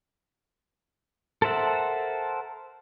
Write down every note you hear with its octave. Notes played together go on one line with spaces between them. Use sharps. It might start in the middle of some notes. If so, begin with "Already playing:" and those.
A4 A#4 C5 E5 F#5